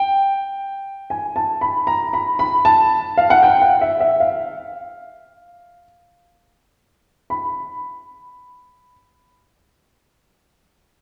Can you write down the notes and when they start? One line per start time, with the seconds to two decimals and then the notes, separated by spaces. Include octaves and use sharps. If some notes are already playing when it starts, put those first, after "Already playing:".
Already playing: G5
1.10 G#5
1.36 A5
1.61 B5
1.87 A#5
2.13 B5
2.39 B5
2.65 A5
3.18 F5
3.30 F#5
3.43 G5
3.62 F#5
3.81 E5
4.00 E5
4.20 F5
7.30 B5